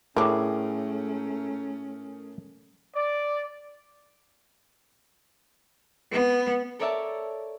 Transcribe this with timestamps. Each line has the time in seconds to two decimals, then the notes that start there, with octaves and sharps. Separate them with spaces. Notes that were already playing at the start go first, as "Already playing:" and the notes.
0.17 A2 G3 A3 C#4 D4 G#4 A#4
2.95 D5
6.12 B3
6.79 A4 A#4 C#5 D5 E5 A5